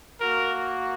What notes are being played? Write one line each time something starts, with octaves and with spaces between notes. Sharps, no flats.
A#3 F#4 A#4